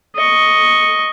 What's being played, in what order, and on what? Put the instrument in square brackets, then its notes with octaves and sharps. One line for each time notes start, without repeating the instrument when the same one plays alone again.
[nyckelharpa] D#5 C#6